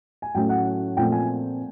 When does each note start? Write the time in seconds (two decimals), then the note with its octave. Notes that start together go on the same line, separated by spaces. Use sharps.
0.22 G#5
0.35 A2 F#3 A3 C#4 G5
0.49 F#5
0.97 A#2 F3 A3 C4 G5
1.12 G#5